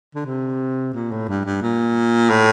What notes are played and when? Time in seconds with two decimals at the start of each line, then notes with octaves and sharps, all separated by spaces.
0.15 D3
0.26 C3
0.94 A#2
1.11 A2
1.28 G2
1.45 G2
1.62 A#2
2.30 A2